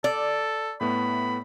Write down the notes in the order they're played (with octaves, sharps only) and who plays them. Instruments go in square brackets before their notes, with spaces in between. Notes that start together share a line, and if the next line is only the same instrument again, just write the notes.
[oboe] A4 [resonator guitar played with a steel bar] D5
[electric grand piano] A2 A3 B3 [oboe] B5